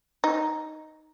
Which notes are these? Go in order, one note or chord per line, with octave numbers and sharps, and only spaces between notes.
D#4